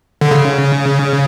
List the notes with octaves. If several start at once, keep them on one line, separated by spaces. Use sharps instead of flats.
D3
C#3